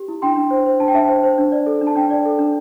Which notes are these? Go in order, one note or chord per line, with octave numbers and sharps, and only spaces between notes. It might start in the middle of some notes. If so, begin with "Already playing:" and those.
Already playing: G4
E4
D4 G5 C6
D4
C5
C5
D4 A5
G5
D4 E5 A5
C5
C5
D4
D5
A4
D4
A5
D4 G5
D5
A4
D4